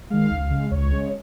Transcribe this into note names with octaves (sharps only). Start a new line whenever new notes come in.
D#3 G#3 F5
C#2
C#3 G#3
C#2 C#5
C#3 G#3